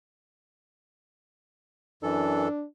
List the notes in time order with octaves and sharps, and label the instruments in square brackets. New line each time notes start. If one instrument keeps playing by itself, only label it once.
[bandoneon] F#2 E3 A4 [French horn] D4